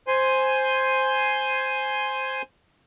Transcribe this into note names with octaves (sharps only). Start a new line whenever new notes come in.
C5 G#5 C6